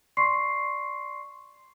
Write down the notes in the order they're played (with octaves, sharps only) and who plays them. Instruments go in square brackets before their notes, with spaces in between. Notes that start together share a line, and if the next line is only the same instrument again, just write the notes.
[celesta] D5 C6 C#6 C7